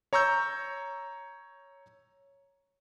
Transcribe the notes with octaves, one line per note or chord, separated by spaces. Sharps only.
C#5 A#5 C#6 E6 G6